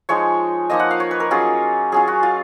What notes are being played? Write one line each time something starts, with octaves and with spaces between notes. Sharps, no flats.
F3 G#3 D#4 C#5
F3 A#3 D#4 D#5
F#5
F5
C#5
B4
A#4
F#3 C#4 F4 G#4
F#3 C#4 F4 G#4
F#4
F4